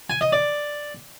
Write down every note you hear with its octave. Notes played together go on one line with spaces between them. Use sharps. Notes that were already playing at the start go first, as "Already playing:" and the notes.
G#5
D#5
D5